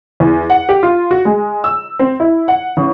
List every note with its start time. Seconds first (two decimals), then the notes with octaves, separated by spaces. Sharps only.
0.20 E2
0.50 F#5
0.69 G4
0.83 F4
1.11 F#4
1.25 G#3
1.64 E6
1.99 C4
2.20 E4
2.48 F#5
2.77 A1